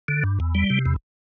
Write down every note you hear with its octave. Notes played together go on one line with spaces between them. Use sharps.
D3
G2
E2
G3
C3
E2